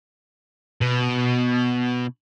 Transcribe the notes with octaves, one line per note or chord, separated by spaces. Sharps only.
B2